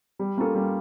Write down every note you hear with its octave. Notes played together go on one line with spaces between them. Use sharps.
G3
A#3 C#4 F4 A4
G3